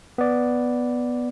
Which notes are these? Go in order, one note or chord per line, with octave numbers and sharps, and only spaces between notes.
B3 D5